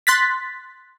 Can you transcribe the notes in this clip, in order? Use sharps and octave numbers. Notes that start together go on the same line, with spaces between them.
C6 F#6 A6 B6